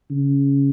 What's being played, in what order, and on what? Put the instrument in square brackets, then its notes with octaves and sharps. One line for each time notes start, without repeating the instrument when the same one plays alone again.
[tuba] C#3